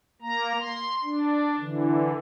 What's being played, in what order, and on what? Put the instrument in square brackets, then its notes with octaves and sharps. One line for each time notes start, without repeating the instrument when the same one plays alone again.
[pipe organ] A#3 A#5
C6
D4
D3 E3